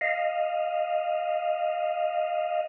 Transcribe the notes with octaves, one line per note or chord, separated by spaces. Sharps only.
D#5 F5